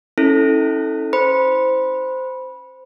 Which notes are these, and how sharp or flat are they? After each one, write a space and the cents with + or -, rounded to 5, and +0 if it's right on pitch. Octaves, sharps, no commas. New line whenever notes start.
C#4 -20 E4 -35 A4 +0
C5 -10 B5 -15